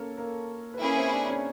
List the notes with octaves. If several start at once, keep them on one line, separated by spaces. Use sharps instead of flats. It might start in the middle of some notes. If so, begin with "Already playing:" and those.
Already playing: A#3 C#4 A4 A#4 C#5
A#3 A#4
B4
A#3 C#4 E4 G#4 A#4
C4 C5
D4 D5
C#4 C#5